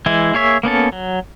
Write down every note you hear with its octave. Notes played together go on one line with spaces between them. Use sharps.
E3 G#3 E4
A#3 G#4 C#5 E5
A#3 B3 C#4 A4
F#3